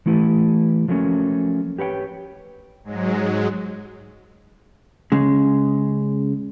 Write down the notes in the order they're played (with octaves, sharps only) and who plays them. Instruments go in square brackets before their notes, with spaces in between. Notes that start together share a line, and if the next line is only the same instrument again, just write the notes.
[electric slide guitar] E3 A3 E4 G4 B4
F3 F#3 A3 A#3 C#4
G4 B4 C#5 F#5 G5
[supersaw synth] G#2 F#3 G#3
[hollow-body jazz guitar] C#3 G#3